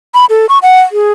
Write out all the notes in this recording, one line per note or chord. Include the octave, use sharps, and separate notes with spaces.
B5
A4
C#6
F#5
G#4